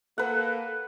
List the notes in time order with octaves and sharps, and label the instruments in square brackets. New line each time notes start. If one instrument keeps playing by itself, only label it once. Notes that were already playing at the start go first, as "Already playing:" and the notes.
[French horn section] A#3 A4 [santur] B4 F#5